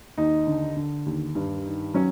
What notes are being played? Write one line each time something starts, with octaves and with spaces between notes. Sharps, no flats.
D#2 D#4
D3
D3
D#2
G2
D#3
F#3 C#4